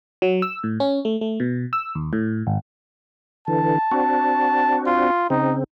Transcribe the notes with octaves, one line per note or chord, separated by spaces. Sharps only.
F#3
E6
A2
C#4
A3
A3
B2
E6
D#2
A2
G#1
D3 E3 A5
C4 D4 F#4
F4
C#3 C4 D#4